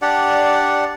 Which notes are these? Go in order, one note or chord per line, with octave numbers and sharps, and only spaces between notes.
D4 G4 D5 F#5